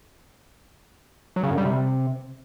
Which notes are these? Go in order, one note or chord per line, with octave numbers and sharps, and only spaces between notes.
F#3
C#3
F#2
G3
C3